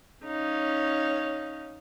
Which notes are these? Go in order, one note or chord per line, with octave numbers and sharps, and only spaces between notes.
C#4 D#4 C#5 F5